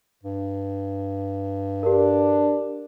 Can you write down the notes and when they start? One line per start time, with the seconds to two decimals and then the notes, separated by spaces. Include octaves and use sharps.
0.23 G2
1.83 D4 G4 A#4